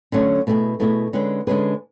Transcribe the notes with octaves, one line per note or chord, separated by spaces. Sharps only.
D3 F#3 A3 C#4
B2 A3 E4 G#4
B2 A3 E4 G#4
D3 G#3 C#4 G#4 B4
D3 G#3 C#4 G#4 B4